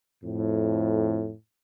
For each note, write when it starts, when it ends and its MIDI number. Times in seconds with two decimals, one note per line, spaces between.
0.24 1.34 41
0.24 1.34 45